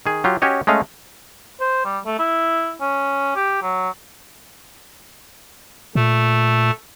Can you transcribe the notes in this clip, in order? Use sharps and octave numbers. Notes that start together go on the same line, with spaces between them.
D#3 G#4
F#3 F4 G4
C#4 F#4 G4 C#5 D#5
G#3 A3 C#4 D#5 F5
C5
G3
A3
E4
C#4
G4
F#3
A#2 A3